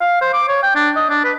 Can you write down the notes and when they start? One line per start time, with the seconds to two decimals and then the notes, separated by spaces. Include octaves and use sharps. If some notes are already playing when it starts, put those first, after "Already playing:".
0.01 F5
0.22 C5
0.33 D6
0.48 C#5
0.63 G5
0.76 D4
0.96 D#5
1.10 D4
1.24 B4